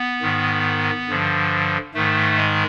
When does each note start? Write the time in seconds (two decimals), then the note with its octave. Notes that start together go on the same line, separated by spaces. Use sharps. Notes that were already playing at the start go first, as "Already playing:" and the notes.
Already playing: B3
0.22 G#2 D#3
1.08 G2 D3 F3
1.94 G#2 D#3 A3
2.37 G#3